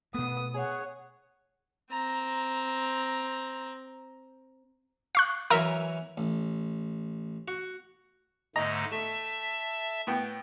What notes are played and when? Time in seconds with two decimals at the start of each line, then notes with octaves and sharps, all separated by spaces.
0.14 B2 A3 B3 D#6
0.54 G#4 C#5 F#5
1.91 C4 A#5
5.15 F5 C#6 F#6
5.50 E3 F#3 A#4 E5 G#5
6.18 A1
7.48 F#4
8.56 G#2 D3 A3 D#5 A#5
8.91 A3 E5 A5
10.07 A2 B3 G5